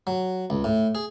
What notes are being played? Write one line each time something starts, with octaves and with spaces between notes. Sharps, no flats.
F#3
C#2
A2
G#4